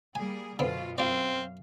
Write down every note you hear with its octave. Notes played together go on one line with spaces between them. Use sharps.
G3 A#3 G#4 G#5
F#2 B2 D3 B3 C4 F4
F#2 C4 F4 D5 F5